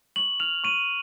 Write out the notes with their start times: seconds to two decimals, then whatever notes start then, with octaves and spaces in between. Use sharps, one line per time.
0.16 C#6 F#7
0.40 F6 F7
0.64 C#6 D#7